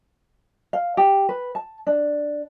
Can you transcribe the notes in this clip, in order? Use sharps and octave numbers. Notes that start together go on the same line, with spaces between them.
F5
G4
B4
A5
D4